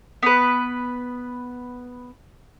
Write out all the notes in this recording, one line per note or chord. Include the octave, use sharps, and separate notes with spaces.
B3 B4